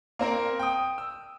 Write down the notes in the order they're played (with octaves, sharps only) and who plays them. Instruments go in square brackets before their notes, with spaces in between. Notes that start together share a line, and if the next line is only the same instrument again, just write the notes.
[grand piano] A#3 C4 A#4
G5 D#6
E6